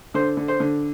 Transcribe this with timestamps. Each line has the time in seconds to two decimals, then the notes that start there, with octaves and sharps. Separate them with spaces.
0.14 D3 C5
0.37 D3
0.48 C5
0.60 D3